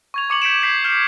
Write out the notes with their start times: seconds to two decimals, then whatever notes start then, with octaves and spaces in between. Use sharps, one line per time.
0.14 C#6 G#6 F7
0.30 C#6 D6 C#7 F7 F#7
0.42 G6 B6 C#7 D7 E7
0.63 G6 G#6 B6 C7 E7
0.84 F6 G6 C7 E7